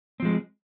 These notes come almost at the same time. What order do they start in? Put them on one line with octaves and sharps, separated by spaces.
C4 F3 G#3